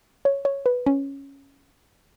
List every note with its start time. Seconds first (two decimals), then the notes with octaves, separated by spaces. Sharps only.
0.25 C#5
0.45 C#5
0.66 B4
0.86 C#4